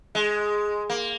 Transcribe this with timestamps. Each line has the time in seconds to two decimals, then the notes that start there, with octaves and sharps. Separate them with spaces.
0.15 G#3
0.90 A#3